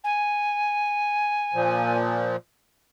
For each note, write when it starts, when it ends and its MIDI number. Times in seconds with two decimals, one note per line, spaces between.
0.03 1.96 80
1.54 2.36 46
1.54 2.36 53